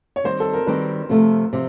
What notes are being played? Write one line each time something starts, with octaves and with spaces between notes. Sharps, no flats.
C#5
D#3 G3 C4 D#4 C5
A4
A#4
D#3 G3 C4 D#4 B4
C3 F3 A3
C3 F3